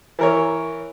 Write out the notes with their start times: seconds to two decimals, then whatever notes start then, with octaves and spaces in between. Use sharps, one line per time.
0.19 E3 A#4 C#5